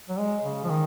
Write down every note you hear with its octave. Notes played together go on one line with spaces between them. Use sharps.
F#3
G#3
C#3
F3
D#3